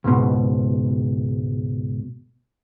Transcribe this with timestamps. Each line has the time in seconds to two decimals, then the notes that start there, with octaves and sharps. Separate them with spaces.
0.04 C#2 G#2 B2